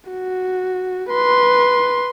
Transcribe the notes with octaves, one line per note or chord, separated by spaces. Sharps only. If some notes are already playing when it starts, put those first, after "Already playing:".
F#4
B4 C6